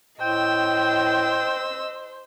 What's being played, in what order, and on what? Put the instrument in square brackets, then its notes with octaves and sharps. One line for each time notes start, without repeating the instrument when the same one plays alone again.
[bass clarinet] A2 [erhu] C5 [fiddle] D#5 E6 [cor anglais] G5